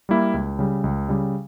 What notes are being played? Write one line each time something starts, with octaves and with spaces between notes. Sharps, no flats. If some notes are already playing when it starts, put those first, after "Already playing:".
G3 A#3 E4
C#2
C#3 G3
C#2
C#3 G3